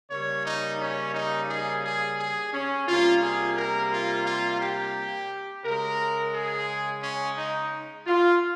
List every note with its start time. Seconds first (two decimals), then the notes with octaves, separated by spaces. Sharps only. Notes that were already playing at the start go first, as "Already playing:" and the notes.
0.11 C#3 G3 A#3 C#5
0.46 D#4
0.81 C#4
1.14 D#4
1.50 G#4
1.84 G#4
2.20 G#4
2.53 C#4
2.88 C3 G3 A#3 F4
3.22 G#4
3.57 A#4
3.92 F4
4.27 F4
4.61 G4
5.65 C#3 G#3 A#4
6.34 G#4
7.03 C#4
7.38 D#4
8.07 F4